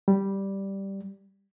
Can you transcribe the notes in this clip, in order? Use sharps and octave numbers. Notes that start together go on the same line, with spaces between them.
G3